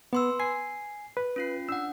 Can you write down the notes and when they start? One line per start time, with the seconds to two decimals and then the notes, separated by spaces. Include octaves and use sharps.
0.13 B3 B4 C6 E6
0.40 G#5 C7
1.17 B4
1.36 C#4 F4 C7
1.69 D4 F#5 E6